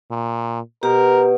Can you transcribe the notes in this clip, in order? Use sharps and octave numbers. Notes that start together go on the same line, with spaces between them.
A#2
B2 G4 A#4